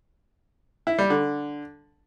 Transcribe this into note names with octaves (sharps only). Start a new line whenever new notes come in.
E4
G3
D3